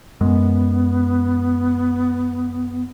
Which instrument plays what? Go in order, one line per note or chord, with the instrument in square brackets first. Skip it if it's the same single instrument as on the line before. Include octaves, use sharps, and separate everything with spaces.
[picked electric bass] F#2 G#3 [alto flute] B3